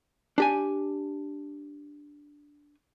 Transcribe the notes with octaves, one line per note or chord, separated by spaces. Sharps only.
D4 G4 G#5